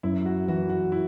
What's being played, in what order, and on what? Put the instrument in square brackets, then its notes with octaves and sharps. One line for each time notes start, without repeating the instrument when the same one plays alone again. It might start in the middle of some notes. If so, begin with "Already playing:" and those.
[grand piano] F#2 [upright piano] E4
[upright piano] F#4
[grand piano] E3 [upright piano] F#4
[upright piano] F#4
E4